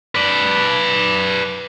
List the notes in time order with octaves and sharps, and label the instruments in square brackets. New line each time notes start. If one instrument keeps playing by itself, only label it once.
[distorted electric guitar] B4 D5